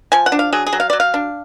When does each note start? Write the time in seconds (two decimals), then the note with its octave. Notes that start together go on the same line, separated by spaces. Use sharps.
0.12 F3 G#5
0.26 F#5
0.32 D4
0.39 F5
0.53 F#3 G#4
0.66 G#4
0.73 F#3
0.80 F5
0.90 F#3 D5
1.00 F5
1.14 D4